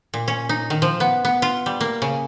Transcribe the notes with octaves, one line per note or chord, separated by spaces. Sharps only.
A#2
C#4
D#4
D#3
F3
B3
B3
F4
G3
A#3
C#3